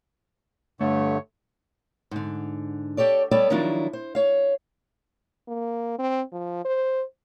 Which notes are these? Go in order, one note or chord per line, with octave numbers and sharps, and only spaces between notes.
G2 D3 A3 C#5
G#2 D3
G4 A4 C#5 D5
G3 B3 A4 C#5 D5
D#3 F3 F#3 D4 E4 F4
C5
C#5 F5
A#3
C4
F3
C5